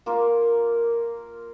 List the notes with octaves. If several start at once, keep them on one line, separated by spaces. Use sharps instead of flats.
A#3 F4 A#4